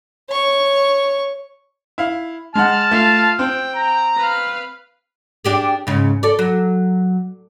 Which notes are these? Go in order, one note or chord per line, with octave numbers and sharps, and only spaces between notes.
C#5 C#6
E4 F5
G#3 F#5 A5 F6
A3 F4 F5
C4 G5
A#5
B4 F5
D4 G4 G#4
G#2 C#3
A4 D5
F#3